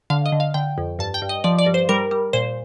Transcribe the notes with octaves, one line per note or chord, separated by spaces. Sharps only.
D3 F5
D#5
D3
F5
D3 G5
F2
G2 A5
G5
G2
D#5
F3 D5
D5
G2
C5
G3 A#4
G3
A#2 C5